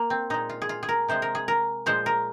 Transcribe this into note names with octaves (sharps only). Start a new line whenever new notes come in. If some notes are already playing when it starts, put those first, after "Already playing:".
Already playing: A#3
C4
A#2 G#3 D#4
F4
G#4
F4
G#4
A#4
C3 F3 G#3 C5
A#4
G#4
A#4
A#2 F3 G#3 C5
A#4